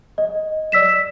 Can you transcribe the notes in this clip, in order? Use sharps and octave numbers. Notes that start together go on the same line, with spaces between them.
D#5
D5 E6 B6 E7